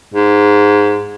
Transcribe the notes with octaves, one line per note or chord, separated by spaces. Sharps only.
G#2